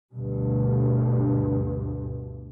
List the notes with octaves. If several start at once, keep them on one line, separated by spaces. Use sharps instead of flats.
D2 G2 B2